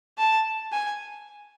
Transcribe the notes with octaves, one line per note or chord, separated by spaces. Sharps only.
A5
G#5